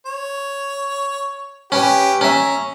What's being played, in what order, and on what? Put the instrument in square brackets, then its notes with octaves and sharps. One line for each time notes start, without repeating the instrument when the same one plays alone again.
[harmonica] C#5
[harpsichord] C#4 [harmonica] G4 B4
[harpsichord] C#4 E5 [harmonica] A#5